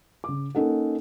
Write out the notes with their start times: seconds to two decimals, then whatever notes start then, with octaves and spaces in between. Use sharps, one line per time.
0.24 C#3 D6
0.55 A#3 C#4 D#4 A4 F#5